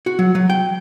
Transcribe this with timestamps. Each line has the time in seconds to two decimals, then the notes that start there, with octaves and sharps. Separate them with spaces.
0.06 F#4
0.19 F#3
0.35 F#3
0.50 G5